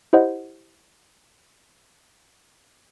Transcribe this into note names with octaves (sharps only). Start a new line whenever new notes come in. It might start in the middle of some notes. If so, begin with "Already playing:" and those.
E4 G4 C5 D#5 F#5